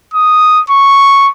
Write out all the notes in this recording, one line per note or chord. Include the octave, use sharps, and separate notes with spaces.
D#6
C#6